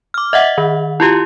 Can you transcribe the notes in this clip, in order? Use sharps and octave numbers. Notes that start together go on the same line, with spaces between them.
D6 F6
D#5 E5 F#5
D#3
E4 F4 G4